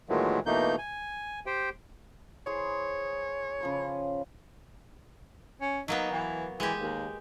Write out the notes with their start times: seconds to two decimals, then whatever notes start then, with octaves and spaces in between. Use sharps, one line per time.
0.09 A#2 D#3 E3 F#3 G#3 A3
0.46 B2 E3 A3 A#3 D#4 G6
0.78 G#5
1.46 G4 C5 G5
2.46 E3 G#4 C5 C#5
3.61 C#3 F3 B4
5.61 C#4
5.88 F#3 A#3 B3 D#4
6.12 E3
6.60 E3 G#3 G4
6.80 D#2